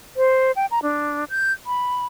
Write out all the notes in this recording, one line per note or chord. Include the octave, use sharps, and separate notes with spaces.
C5
G5
A#5
D4
G6
B5